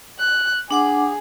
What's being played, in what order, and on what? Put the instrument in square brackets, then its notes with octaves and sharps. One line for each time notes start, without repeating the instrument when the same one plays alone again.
[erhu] F#6
[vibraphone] D4 F#5 D6 [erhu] G#4